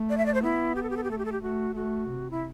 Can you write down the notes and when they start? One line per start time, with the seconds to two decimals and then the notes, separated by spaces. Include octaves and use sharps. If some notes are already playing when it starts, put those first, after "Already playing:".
Already playing: A3
0.10 D5
0.18 E5
0.26 D5
0.34 C5
0.43 B3 E4
0.76 G4
0.83 A4
0.90 G4
0.97 A4
1.04 G4
1.09 A3 A4
1.18 G4
1.25 A4
1.32 G4
1.42 A3 F#4
1.75 A3 F#4
2.09 C3
2.31 E4